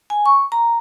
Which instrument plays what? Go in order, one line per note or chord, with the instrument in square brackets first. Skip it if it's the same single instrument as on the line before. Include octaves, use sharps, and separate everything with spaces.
[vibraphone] G#5
C#6
A#5